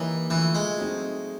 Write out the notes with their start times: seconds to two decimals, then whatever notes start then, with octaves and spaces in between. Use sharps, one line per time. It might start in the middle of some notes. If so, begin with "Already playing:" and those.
Already playing: E3 A#3 D#4 G4 A#4 C#5
0.30 D3 E3 F3 A3
0.55 G#3
0.78 F#3 A3 C4 D#4